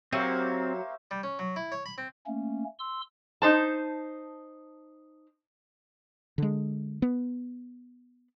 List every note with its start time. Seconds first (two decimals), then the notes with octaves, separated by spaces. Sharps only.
0.12 F#3 A#3 C4 G4 C5 E5 C#6
1.11 G3
1.23 C#4
1.39 F#3
1.56 E4
1.72 C#5
1.86 B5
1.98 C4
2.27 A3 A#3 C#4
2.79 C6 E6
3.42 D#4 C5 A5
6.38 D3 G#3
7.02 B3